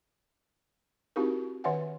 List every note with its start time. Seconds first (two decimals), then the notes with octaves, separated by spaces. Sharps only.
1.16 C4 D#4 E4 F#4 G4 A#4
1.64 D#3 C#5 E5 F#5 G#5